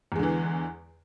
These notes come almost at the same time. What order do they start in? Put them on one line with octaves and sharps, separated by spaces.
E2 G#3 D3 E3